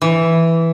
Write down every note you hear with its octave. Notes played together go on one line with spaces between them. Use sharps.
E3